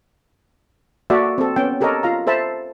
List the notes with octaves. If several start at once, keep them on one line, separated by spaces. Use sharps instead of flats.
A#3 F#4 A4 D5 E5
C4 A4
B3 C#4 G5
G4 A4 A#4 C#5 D#5
F4 F5 A#5
A4 C5 E5 A5 B5